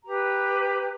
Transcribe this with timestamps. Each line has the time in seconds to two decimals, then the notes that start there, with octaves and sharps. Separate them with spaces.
0.05 G4 B4 A#5